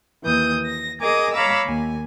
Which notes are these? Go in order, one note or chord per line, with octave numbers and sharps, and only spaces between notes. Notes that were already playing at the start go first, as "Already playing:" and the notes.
D#2 E3 D#6 G6
A#6
G#4 A#4 D#5 D6 D#6
C#5 F5 A#5 B5 D6 E6
D#2 G#5